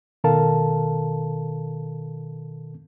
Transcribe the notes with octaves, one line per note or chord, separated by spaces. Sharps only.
B2 D#3 A4 A#4 F5 A5